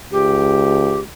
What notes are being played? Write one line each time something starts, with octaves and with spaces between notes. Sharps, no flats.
C#2 G4